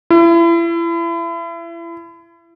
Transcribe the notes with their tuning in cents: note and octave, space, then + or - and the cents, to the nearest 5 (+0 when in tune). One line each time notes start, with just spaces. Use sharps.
E4 +35